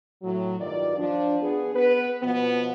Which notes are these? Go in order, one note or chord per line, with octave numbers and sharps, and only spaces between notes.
A2 F#3
G2 D#3 F4 D5
F3 D4
B3 G#4
B3 B4
B2 F3 B3